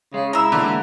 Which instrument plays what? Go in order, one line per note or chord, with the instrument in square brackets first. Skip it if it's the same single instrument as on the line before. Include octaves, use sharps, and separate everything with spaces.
[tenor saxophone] C#3 [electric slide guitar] G#3
[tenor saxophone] E4 [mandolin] A#5 E6
[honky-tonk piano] D3 [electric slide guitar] E3 G#3 A#3